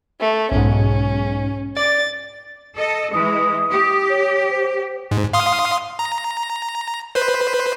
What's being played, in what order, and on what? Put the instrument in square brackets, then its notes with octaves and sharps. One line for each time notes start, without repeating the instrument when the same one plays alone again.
[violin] A3
[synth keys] B1 G#2 [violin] C#4
[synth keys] D5 [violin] A6
[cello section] A4 D#5
[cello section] E3 G#3 [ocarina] D#6
[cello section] G4
[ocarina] C#5
C5
[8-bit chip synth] G#2
F5 C6 D#6
A#5
B4 C5